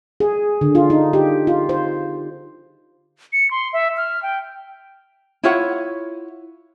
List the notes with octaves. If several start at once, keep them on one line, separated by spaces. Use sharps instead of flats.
G#4
D3
F4
D#4
G4
F4
C5
C#7
C6
E5
F6
G5
E4 F4 C#5 F#5